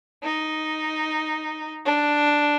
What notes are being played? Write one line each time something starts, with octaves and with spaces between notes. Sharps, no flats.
D#4
D4